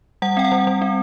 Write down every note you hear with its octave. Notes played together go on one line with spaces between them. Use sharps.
G3 F#5
C4 G5
F#5
G3
G3
C4